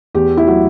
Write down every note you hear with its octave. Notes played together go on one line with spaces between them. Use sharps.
E2 G4
E4
F#3